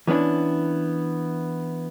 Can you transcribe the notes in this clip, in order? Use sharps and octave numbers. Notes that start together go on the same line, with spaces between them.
E3 B3 C#4 D4 E4